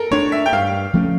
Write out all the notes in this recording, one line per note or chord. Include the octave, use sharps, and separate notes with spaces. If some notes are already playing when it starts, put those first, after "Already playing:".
Already playing: A4 A#4
A3 D4 C#5
E5
G5
G2 F5
F3 A3 C#4